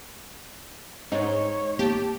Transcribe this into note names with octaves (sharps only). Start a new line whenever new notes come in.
G#2 D#4 C#5
A#3 G4 A5